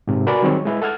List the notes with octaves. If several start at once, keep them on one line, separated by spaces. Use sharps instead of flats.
G#2 C3
F#4 A#4 B4 D5 G#5 B5
D#3 F#3 G3 C4 G#4 C#5
G#3 E4 B4
A4 F#5 F6 G#6